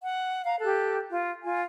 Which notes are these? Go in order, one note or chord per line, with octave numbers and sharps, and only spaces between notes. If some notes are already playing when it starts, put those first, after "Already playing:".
F#5
F5 A#5
G4 A4 F#6
F4
F4 G#5